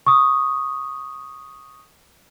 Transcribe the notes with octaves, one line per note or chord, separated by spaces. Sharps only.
C#6 D#6